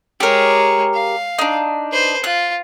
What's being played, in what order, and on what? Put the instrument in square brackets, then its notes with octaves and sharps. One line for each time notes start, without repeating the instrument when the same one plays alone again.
[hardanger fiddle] G#3 C#5 [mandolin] G4 A#4
[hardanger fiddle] F5
[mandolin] D4 D#4
[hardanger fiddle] B4 C5
[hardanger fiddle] F4 [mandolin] F#6